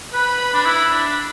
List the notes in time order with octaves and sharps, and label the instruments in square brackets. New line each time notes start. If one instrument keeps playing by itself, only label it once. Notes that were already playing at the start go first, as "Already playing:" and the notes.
[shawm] B4 [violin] B5
[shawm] D4
E4
D4